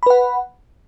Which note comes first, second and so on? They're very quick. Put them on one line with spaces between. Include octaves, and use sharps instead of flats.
B5 B4 F#5